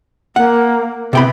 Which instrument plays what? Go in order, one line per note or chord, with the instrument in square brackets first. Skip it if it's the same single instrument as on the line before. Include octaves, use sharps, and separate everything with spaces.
[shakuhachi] A#3 [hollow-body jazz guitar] F#5
[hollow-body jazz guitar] C3 G5 B5 [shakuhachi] B3